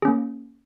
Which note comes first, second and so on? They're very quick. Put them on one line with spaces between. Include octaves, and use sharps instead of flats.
G#4 C#4 A#3